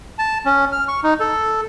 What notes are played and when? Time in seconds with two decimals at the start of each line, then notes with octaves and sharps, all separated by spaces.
0.18 A5
0.46 C#4
0.72 F6
0.88 C#6
1.03 D#4
1.20 A4